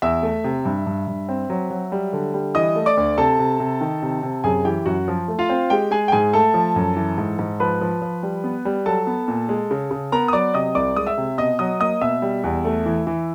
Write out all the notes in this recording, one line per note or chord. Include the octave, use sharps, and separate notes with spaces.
E2 E5 E6
A3
C3
G2
G2
G2
C4
F#3
F#3
G3
D3
G3
E3 D#5 D#6
A3
D5 D6
D2
C3 A4 A5
C3
C3
D#3
C3
C3
F#2 G#4 G#5
E3 G4 G5
F#2 F#4 F#5
F3
A3
F4 F5
C4
G#3 G4 G5
G#3 G#4 G#5
G5
G#2 G#4 G#5
A3 A4 A5
F3
F#2
E3
G#2
G#2
F3 B4 B5
F3
F3
G3
B3
G3
F#3 A4 A5
B3
A#2
G#3
C#3
C#3
B3 A#4 A#5
D#6
F#3 D5 D6
C3 D#5 D#6
C2 D5 D6
G#3 D#6
E5 E6
C3
B2 D#5 D#6
F#3 D#5 D#6
A#3 D#5 D#6
B2 E5 E6
G3
E2
A3
E3
E3